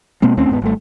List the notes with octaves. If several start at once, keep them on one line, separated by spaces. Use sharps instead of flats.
B2 G#3 A#3 C4
D#2 A3 C4 C#4
D#1 G#2 B3
G#1 G3 A3